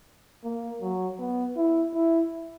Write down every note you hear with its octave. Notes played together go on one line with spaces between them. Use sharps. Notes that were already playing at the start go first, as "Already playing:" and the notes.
A#3
F#3
B3
E4
E4